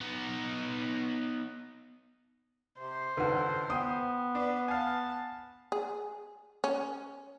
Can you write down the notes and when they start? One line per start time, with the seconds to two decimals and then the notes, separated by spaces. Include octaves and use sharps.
0.01 B3 D#4
2.78 C3 C5
3.17 G#1 C#2 G2 A4 B4 F#5
3.70 B3 G5 D#6
4.35 D4 B4
4.68 F5 G#5 A5
5.72 G#4
6.64 C#4